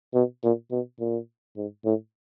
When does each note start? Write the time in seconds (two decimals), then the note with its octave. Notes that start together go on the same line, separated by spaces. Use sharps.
0.14 B2
0.43 A#2
0.71 B2
1.00 A#2
1.57 G#2
1.85 A2